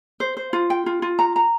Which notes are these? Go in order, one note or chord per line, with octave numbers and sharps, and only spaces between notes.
C5
C5
F4
G5
F4
F4
A#5
A#5